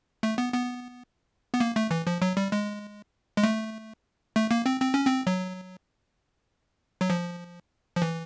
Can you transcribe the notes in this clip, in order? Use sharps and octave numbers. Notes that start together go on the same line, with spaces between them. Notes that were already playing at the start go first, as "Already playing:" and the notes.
A3
B3
B3
B3
A#3
A3
E3
F3
F#3
G3
G#3
G#3
A3
A3
A#3
C4
C4
C#4
C4
F#3
F#3
F3
F3
E3